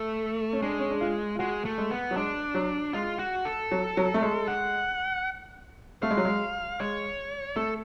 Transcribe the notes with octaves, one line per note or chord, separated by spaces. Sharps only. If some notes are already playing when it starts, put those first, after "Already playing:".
Already playing: A3
C#4
G#3 D4
C#4
D4
F4
F4
G#3 F#4
A3
G#3
B3
F#3
G#3 D4
F#3
G#3 F4
F#4
A4
F#3
F#3
A3
G#3
F#5
A3 F5
G#3
F#3
G#3
G#3 C#5
A3 A4